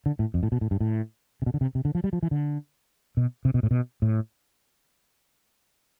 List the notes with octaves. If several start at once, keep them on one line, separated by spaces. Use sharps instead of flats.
D3
A2
F2
A2
B2
A2
G2
A2
C3
B2
D3
C3
C3
D3
F3
G3
F3
E3
D3
B2
C3
B2
A2
B2
A2